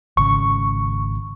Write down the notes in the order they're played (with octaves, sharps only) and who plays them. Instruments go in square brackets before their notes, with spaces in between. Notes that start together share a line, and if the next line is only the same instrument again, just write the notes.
[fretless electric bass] G#1 C#3 [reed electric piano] C#6